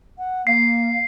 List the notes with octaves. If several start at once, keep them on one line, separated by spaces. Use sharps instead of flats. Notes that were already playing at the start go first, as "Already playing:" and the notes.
F#5
A#3 F5 C7